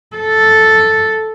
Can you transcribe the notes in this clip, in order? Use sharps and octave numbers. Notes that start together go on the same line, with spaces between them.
A4